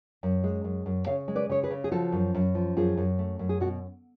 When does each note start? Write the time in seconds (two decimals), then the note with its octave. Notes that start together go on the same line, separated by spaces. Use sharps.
0.23 F#2
0.44 G#3
0.64 F#2
0.86 F#2
1.06 C#3 C#5 F5
1.28 G#3
1.35 B4 D5
1.49 C#3 C#5
1.64 G#4 B4
1.71 C#3
1.84 G#4
1.92 F3 F#4 A4
2.12 F#2
2.35 F#2
2.55 F3
2.77 F#2 F4 G#4
2.97 F#2
3.19 A3
3.39 F#2
3.49 G#4
3.60 B2 F#4